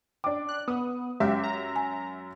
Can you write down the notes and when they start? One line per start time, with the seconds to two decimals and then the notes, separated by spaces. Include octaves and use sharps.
0.24 D4 G5 D6
0.49 F#6
0.68 B3 D#6
1.20 F#2 G#3 G4 E5
1.44 A#5
1.76 G#5